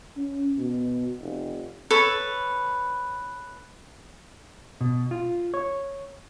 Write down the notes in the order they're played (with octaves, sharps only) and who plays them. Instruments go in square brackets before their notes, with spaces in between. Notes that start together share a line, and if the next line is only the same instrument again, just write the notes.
[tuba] C#4
B2
F1
[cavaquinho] A4 B4 C#5
[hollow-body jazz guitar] B2
F4
C#5